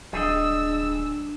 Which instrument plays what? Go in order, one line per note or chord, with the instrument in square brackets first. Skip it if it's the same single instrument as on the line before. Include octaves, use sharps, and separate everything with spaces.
[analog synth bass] D1 [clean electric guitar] G3 G#4 D#5 [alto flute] D4 [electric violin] E6